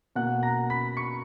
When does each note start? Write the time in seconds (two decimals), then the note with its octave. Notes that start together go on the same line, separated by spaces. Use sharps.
0.15 B2 A#3 F#5 F#6
0.43 A#5 A#6
0.70 B5 B6
0.97 C#6 C#7